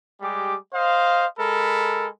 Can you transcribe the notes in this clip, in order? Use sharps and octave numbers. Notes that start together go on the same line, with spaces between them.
G3 G#3 G4 D6
C5 D#5 F5
G#3 A4 A#4 B5